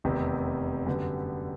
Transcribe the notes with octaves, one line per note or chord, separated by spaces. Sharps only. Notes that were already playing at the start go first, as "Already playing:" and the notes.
F1 E2 C3 D#3
F#2 D3 G3 B3